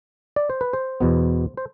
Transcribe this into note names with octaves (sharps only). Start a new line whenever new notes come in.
D5
C5
B4
C5
E2 B2 B3
C5